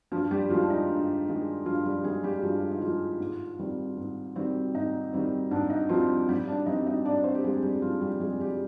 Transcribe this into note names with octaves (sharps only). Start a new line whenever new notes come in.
G2 F3 F4
G3 G4
D#3 F3 G#3 F4
D4
D#4
G2
D#3 G#3
G2 F3 F4
G3 G4
D#3 G#3 G#4
G3 G4
G2 F3 F4
D#4
D#3 F3 G#3 F4
G#2
D#3 G3 C4
G#2
D#3 G3 C4
G#2 D#4
D#3 G3 C4
G#2 D4
D#4
D#3 F3 G3 C4 F4
G#2 G3 G4
D4 D5
G3 C4 D#4 D#5
D#4 D#5
G#2 D4 D5
C4 C5
G4
G3 G#3 C4 G#4
G3 G4
G#2 F3 F4
G3 G4
G3 G#3 C4 G#4
G3 G4